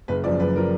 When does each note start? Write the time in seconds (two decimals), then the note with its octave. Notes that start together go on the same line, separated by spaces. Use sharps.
0.08 F#1 B4
0.24 F#2 F3 D5
0.40 F#1 B4
0.56 F3 A#4